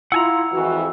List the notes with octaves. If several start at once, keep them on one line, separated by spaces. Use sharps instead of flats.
E4 F4 F#5 G#5 A#5 E6
F2 G#2 E3 F#4